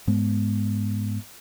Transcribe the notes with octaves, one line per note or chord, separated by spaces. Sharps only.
G#2 G#3 B3